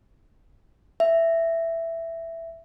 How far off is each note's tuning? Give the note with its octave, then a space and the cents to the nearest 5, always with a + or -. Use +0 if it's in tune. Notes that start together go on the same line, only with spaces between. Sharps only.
E5 +5